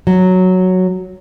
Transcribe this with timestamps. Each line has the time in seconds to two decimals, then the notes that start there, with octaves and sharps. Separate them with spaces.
0.07 F#3